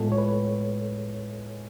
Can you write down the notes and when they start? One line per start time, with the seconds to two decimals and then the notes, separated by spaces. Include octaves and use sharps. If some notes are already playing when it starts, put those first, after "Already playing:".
Already playing: A2 G#3 B3 F4 G#4 A4
0.12 C#5
0.18 B4